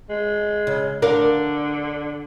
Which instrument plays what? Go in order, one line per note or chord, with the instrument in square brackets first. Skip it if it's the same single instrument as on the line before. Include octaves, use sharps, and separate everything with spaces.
[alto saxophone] G#3
[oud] C#3
[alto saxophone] D3 [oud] D4 A#4 F5